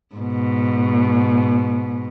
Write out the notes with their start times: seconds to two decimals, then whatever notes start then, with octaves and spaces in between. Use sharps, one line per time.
0.15 G#2 B2